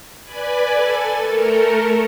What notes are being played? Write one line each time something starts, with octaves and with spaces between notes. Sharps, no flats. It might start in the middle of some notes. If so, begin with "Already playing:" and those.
B4 D5 G#5 B5
A4 G#5 A6
A3 A4 A#4